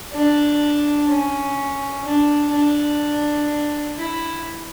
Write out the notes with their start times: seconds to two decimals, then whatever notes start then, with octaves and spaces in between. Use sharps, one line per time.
0.13 D4
1.09 C#4
2.05 D4
2.53 D4
3.97 E4